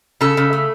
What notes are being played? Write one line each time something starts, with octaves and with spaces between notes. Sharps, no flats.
C#3 A4
C#3
A3